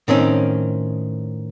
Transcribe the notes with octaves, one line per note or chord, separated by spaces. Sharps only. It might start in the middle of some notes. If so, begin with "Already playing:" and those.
A2 D#3 C4 C#4